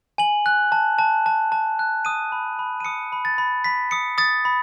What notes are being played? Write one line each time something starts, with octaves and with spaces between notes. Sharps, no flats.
G#5 F#7
F#6
A5
A5
A5
A5
F#6
D#6 D#7
B5
B5
D#7
D#6 C#7
B5
A6
B5
B5 B6
D#6 C#7
D#6 A6
B5